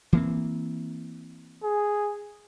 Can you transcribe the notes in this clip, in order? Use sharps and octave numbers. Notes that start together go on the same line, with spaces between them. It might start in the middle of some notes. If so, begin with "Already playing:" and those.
E3 A#3 C4
G#4